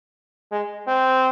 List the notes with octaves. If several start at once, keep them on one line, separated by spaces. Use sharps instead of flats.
G#3
C4